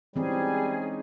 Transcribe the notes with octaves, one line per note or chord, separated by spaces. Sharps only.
E3 G3 G#3 C4 C#4 D#4 G#4